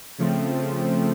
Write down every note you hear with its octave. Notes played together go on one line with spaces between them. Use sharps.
C#3 F3 A3 C4